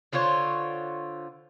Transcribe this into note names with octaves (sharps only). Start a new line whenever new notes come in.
D3 F4 C5 C#5